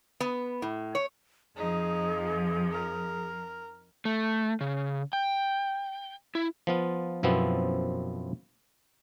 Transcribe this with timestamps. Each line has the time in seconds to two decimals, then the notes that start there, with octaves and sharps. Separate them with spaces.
0.20 B3
0.62 A2
0.95 C#5
1.57 F2 F3 D#4 G#4
2.72 A#4
4.05 A3
4.61 C#3
5.13 G5
6.35 E4
6.67 F3 B3 F4
7.23 F#2 B2 F3 B3 C4 E4